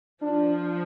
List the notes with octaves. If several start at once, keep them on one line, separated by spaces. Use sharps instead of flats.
F3 D4